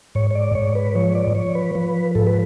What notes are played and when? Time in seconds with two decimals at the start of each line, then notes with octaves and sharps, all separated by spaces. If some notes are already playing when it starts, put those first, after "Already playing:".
0.15 G#2 C#5
0.31 C#5
0.35 D5
0.55 G#2 C#5
0.75 B4
0.95 F3 C#5
1.15 D5
1.35 F3 C#5
1.55 B4
1.75 F3 B4
2.15 G#2 A4
2.27 B4